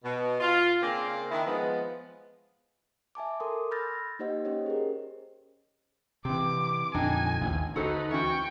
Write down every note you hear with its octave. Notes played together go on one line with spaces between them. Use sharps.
B2
F4
C#3 A#3 C4 D4 C5 D5
D#3 D4 E4
F3 G#3 B3
E5 G#5 A5 D6
A4 A#4 C6 D6 D#6
B5 E6 F6 G6 A6 A#6
A#3 D#4 G4 C5 D#5 F#5
C#4 G4 C5 C#5 D#5
G#4 A#4
C3 E3 C4 D6
F2 A#2 D3 D4 D#4 G5 G#5
A1 D#2
D2 D#4 F#4 A4 B4 C5
E3 C#4 F#4 G5 C#6